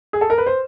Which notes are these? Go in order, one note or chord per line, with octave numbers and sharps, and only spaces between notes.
G#4
A4
A#4
B4
C5